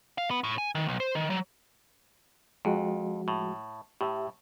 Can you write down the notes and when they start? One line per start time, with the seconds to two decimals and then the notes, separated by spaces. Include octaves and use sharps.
0.18 F5
0.31 B3
0.44 A2
0.58 G#5
0.75 D#3
0.88 B1
1.00 C5
1.15 D#3
1.30 F#3
2.65 F2 F3 G#3 F#4
3.28 A2
4.01 A2 G4 E5